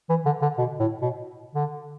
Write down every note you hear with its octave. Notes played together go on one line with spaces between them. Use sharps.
E3
D3
D3
B2
A2
B2
D3